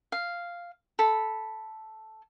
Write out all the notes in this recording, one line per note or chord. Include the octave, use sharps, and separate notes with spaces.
F5
A4 B5